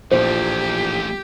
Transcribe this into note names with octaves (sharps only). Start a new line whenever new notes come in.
A#1 E3 F3 A3 G4 C5